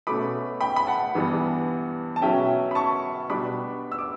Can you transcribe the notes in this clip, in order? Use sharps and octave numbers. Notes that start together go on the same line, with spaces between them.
B2 A3 C#4 B5 D6
G5 B5
B5
F#5 A5
G2 E3 G3 B3 D4
A5
B2 F#3 C#4 E5 G5
B5
A5 C#6
B2 G3 D4 B5 D6
E6
D6